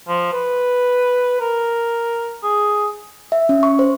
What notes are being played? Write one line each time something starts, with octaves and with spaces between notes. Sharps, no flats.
F3
B4
A#4
G#4
E5
C#4
C#6
C5